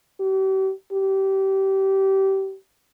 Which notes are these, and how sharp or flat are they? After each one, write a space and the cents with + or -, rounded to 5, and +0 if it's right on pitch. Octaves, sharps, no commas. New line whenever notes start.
G4 -40
G4 -25